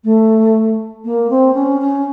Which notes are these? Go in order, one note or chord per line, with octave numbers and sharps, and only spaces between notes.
A3
A#3
C4
C#4
C#4